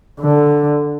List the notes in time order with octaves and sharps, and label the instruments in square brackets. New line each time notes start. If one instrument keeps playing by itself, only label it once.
[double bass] D3